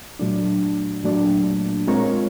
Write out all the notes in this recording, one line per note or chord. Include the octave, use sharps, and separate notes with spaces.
A#2 F#3 A3 D4
A#2 F#3 A3 D4
G#3 C4 F4 A#4 C#5